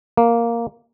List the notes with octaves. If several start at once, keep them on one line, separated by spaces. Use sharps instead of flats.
A#3